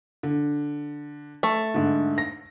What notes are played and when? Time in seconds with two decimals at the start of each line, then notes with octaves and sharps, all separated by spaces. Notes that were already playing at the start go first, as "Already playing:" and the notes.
0.23 D3
1.43 A3
1.74 G#2 D3
2.18 A#6